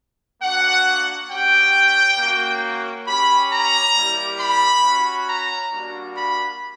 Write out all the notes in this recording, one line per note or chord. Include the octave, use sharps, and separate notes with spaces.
A#3 D4 F#4 F#5
C#4 G4 G5
A#3 C#4 F#4
C#4 G4 B5
A#5
G3 A#3 E4 G4
B5
C#4 F#4
A#5
G3 A#3 D4 F#4
B5